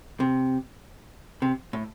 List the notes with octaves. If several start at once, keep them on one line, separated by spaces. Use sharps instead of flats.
C3
C3
A2